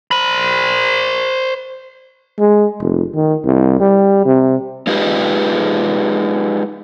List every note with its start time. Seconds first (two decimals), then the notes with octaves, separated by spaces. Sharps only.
0.11 C5 B5
2.39 G#3
2.80 F1
3.15 D#3
3.45 C2
3.80 G3
4.25 C3
4.87 G#3 D#4 F4 G4 B4